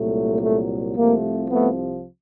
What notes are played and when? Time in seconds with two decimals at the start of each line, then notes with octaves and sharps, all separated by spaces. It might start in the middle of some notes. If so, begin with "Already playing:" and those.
Already playing: C2 A#2 F#3 A3
0.41 A3
0.96 C2 C3 F3 A3 A#3
1.50 A3 B3